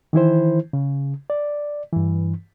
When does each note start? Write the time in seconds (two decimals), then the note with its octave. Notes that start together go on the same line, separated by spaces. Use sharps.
0.13 D#3 E3 E4 C5
0.73 C#3
1.30 D5
1.92 G2 E3